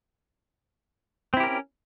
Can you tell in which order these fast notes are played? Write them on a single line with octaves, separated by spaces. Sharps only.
C4 E4 G4 A#4 C#4